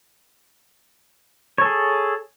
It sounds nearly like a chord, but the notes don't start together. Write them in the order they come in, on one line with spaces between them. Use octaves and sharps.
C#5 A4 G#4